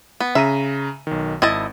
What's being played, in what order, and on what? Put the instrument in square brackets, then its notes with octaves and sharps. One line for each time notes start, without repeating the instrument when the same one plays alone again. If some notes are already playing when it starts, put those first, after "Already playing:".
[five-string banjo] B3
[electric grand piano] C#3 A#5 D#7 [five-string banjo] E5
[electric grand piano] B1 D#3
[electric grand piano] G#1 [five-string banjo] E4 D#5 A5